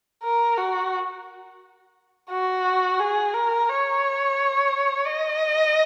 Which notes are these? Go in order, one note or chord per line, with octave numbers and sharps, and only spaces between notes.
A#4
F#4
F#4
G#4
A#4
C#5
D#5